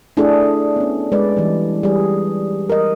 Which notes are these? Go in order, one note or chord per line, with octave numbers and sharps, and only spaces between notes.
A3 D4 E4 G#4 A4
B3 C#4
G#3 B4 D5
E3 G3
G3 G#4
A#4 D#5